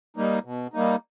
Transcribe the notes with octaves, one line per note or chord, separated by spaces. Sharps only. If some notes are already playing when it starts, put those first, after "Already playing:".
G3 A#3 D#4
B2
G3 A#3 D#4